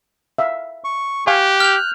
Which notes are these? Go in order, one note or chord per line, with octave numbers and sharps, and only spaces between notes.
E5 F5 E6
C#6
G4 F5 G#5 C#6 F#6
F6 G6 F7